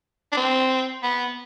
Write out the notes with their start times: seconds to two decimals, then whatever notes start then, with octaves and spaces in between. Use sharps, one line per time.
0.32 D4
0.37 C4
1.03 B3